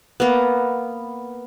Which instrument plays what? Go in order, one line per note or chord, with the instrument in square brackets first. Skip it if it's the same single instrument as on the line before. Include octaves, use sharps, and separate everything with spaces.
[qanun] A#3 B3